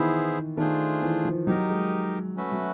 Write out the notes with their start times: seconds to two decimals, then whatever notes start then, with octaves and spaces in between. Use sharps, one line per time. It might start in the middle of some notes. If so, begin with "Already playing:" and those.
Already playing: D#3 E3 B3 E4 G#4 C5 E5
0.57 D#3 A3 D4 F4 G#4 C5
1.02 E3
1.25 F3
1.46 F#3 D#4 G4 A#4 D#5
1.69 G#3
2.36 A3 C#4 F#4 B4 E5
2.52 F#3